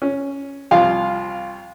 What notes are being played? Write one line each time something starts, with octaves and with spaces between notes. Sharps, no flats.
C#4
C2 F3 F4 F5